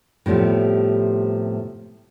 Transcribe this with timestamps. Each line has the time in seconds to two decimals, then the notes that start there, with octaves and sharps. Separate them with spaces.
0.26 A2 C3 F3 G3 B3